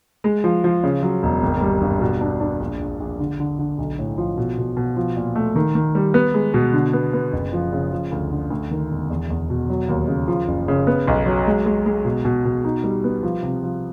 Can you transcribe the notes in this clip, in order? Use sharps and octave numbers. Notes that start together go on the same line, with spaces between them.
G#3
F3
F3
C#3
F#3
E1
G#1
G3
G2
B2
D4
D4
A#1
A#1
A#1
D3
D3
D3
B1
A2
F3
B2
B2
B2
F3
A#2
A3
D#3
D#3
G3
B3
G#3
B2
D3
B3
B3
F#1
F3
C#3
F3
D2
D3
D2
D#3
E1
E2
E2
B2
F#3
D#2
C#3
F3
F#1
C#3
B3
B1
F#3
G#3
G#3
G#3
B2
B2
B2
D#4
G3
B3
F3
C3
F3